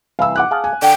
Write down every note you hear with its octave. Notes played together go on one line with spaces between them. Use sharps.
C2 E3 F5 E6
F#5 D6 F#6
G#4 F5 A5
G#5
D3 G5